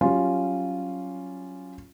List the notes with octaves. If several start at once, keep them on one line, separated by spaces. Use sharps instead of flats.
F#3 G3 C#4 F4